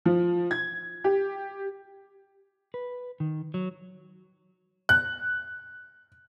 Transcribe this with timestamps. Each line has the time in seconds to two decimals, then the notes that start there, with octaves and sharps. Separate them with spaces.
0.05 F3
0.51 G#6
1.04 G4
2.74 B4
3.20 D#3
3.54 F#3
4.89 F#6